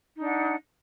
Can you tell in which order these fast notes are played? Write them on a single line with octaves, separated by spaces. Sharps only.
D#4 D4 F#5